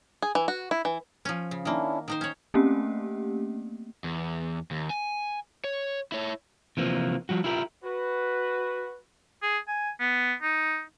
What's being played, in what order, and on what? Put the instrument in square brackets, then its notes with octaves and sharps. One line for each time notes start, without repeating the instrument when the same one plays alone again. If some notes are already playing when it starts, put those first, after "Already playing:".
[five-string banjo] G#4
E3
F#4
E4
E3
[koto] F3 C#4
C#3
[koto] D#3 A#3 [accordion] C#4 D4 E4
[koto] D#3 D#4 C5
[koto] C#4 C#5 [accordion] G6
[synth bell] A3 A#3 C4 C#4 G4
[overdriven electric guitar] E2
D#2
G#5
C#5
E4 C#5
[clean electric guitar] C3 E3 F3 A#3
F3 G3 F#4
E4 F4 G4 A#4
[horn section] F#4 B4
[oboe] G#4
G#5
B3
D#4